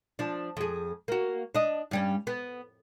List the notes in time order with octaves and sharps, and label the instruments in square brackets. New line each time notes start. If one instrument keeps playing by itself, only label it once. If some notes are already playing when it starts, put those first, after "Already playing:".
[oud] F3 D4
F2 G#4
A#3 F#4
D4 D#5
G2 G3 C#4
B3